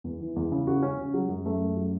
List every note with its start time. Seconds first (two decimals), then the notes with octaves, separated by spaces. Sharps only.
0.04 E2
0.20 E3
0.36 E2
0.52 C#3
0.67 F#4
0.82 C#4
0.98 C#3
1.14 F#3
1.29 F#2
1.46 A3
1.60 F#2
1.77 F#3